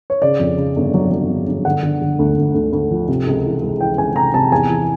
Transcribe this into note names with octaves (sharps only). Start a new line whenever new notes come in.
C#5
C#3 D5
F2
C#3
G1
F#3
F#3
G1
G1
D3 F#5
D3
D3
D2
D2
D2
D2
F3
C3
C#2
E3
G#3
E3 G5
C#2 G#5
C3 A#5
C3 A5
E2 G#5
E3